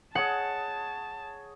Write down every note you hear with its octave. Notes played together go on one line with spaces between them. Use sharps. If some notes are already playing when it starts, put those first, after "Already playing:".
G#4 C#5 D#5 F#5 A5